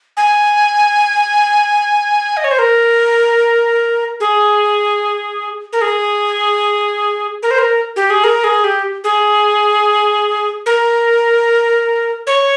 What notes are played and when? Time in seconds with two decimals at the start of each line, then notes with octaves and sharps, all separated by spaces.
0.17 G#5
2.37 D#5
2.44 C#5
2.51 C5
2.59 A#4
4.20 G#4
5.73 A#4
5.81 G#4
7.43 A#4
7.51 C5
7.58 A#4
7.96 G4
8.10 G#4
8.24 A#4
8.44 G#4
8.64 G4
9.04 G#4
10.66 A#4
12.27 C#5